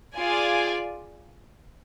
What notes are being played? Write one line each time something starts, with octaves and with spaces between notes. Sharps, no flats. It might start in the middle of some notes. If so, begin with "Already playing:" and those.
F4 G#4 D5 G#5